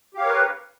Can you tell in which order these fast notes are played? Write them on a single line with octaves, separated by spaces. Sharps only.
G4 F5 C#5 A#4 B4